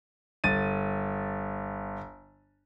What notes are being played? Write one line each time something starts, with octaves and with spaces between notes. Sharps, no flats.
G1 A6 D#7